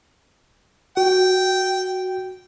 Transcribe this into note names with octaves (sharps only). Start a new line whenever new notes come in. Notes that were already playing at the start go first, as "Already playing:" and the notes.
F#4 G5